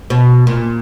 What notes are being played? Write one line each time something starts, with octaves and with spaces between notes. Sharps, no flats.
B2
A#2